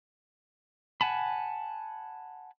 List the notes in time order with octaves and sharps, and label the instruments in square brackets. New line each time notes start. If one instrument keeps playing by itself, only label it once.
[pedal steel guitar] F#5 G#5 A5 B5